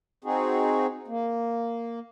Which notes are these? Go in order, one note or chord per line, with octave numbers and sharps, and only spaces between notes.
C4 D#4 F#4 G#4
A#3